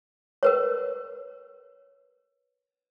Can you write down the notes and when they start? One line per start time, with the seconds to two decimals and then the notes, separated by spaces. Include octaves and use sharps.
0.43 A#4 B4 C#5